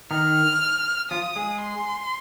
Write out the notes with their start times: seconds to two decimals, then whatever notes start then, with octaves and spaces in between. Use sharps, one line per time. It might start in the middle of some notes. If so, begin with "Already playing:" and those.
0.11 D#3 D#4 F6
1.11 F3 F4 D#6
1.36 G#3 G#4
1.61 C6